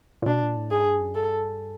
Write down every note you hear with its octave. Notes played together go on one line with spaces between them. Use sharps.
A#2
B2 D4
A#2
A2
G#2 G#4
G2
F#2
G2 A4